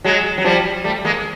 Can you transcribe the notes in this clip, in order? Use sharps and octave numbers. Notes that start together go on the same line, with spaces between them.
F#3 G#3
F#3
F3 G3
G3 A3
G#3 A#3